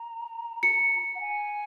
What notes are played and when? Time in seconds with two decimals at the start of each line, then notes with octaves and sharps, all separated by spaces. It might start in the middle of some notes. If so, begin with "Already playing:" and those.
Already playing: A#5
0.63 C#7
1.15 F#5
1.20 G#5